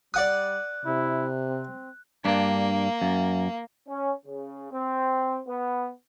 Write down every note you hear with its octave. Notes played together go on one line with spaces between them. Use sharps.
G3 D5 F#5 D#6 F#6
C3 E4
C4
G2 A#3 D4
F#2
C#4
C#3
C4
B3